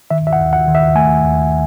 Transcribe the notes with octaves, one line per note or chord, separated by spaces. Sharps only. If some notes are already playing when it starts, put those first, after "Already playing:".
D#3 E5
E5
F#5
D#2
F#5
D#3
E5
A3 G#5
D#2